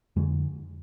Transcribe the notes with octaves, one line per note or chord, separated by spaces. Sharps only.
F2 D3 G#3